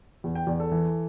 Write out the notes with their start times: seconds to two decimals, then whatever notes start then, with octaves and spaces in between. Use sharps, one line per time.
0.24 E2
0.35 G5
0.47 E2 D5
0.60 A4
0.72 E3